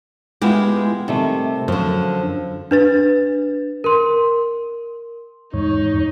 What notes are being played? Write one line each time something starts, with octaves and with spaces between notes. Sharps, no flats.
G#3 B3 E4 F4 G4
C3 D#3 G3 A3
F#2 D3 F3
D4 B4 A6
A#4 C6
E2 G#2 D#4 C#5